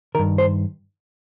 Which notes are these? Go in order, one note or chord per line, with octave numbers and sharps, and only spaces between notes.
G2 D#3 A#4
C5